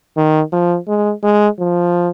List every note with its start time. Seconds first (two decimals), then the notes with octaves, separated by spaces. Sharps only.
0.17 D#3
0.52 F3
0.88 G#3
1.23 G#3
1.59 F3